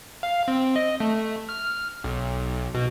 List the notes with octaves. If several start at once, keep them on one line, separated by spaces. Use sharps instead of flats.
F5
C4
D#5
A3
F6
B1
B2